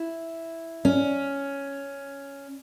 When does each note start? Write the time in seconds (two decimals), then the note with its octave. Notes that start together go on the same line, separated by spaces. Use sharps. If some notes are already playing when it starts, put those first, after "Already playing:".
Already playing: E4
0.85 C#4